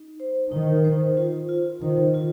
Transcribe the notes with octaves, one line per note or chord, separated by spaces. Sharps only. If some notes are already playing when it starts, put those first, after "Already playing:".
Already playing: D#4
C5
D#3 D#4
C5
F4
F4
D#3 C5
F4